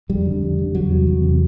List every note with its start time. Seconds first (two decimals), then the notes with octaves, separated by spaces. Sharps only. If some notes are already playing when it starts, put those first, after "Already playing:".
0.09 F2 G3
0.25 D3
0.42 F2
0.58 D3
0.74 E2 F#3
0.91 C3
1.07 E2
1.23 C3